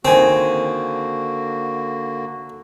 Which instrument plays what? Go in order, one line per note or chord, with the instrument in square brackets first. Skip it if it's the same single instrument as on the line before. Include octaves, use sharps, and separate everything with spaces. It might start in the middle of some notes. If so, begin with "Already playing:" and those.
[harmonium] D3 A#3 F#4 [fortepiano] D#3 G#5 [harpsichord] C4